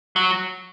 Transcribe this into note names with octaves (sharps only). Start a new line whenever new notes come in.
F#3